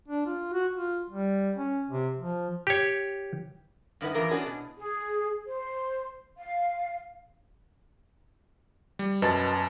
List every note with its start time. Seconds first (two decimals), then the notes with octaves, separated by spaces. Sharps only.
0.08 D4
0.26 F4
0.53 F#4
0.75 F4
1.10 G3
1.56 C#4
1.90 C3
2.18 F3
2.67 G4 C#5
4.01 G2 D#3 E4 B4 F#5
4.14 F#2 A2 E3 F4 A#4
4.31 B3 C#4 D4 F#4 G#4
4.46 B2
4.78 G#4
5.47 C5
6.37 F5
8.99 G3
9.22 F#2 B2 A5 A6